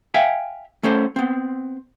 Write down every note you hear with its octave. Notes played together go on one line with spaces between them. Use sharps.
E5 F5 G5 G#5
A3 C#4 A4 C5
B3 C4